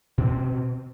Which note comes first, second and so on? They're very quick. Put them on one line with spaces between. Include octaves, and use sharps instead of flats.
B2 D4 C4